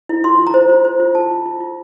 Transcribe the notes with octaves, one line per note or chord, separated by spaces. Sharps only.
E4
F4 C6
F4
A#5
C5
F4
C5
F4
F4 A5
F4
F4
F4